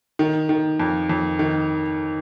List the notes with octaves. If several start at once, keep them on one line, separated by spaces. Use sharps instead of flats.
D#3
D#3
F2
F2
D#3